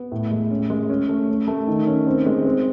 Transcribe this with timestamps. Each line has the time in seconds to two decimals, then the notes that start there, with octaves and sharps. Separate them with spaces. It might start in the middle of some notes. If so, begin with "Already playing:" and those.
Already playing: B3
0.12 A2
0.31 G#3
0.51 C#4
0.70 G#3
0.90 C#4
1.09 A3
1.28 C#4
1.47 A3
1.68 D#3
1.87 C#4
2.07 C4
2.26 G#3
2.45 C4